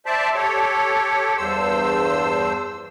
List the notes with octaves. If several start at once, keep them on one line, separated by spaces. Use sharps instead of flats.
C5 D5 E5 A5
G4 A4 C#5
E2 G2 C5 E6